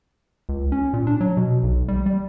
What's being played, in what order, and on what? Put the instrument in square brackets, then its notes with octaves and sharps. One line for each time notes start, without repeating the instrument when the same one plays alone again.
[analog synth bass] C#2
C#4
A#2
D4
F#3
B2
B1
G3
G3